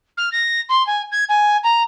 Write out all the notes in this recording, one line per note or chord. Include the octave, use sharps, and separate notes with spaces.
F6
A#6
C6
G#5
G#6
G#5
A#5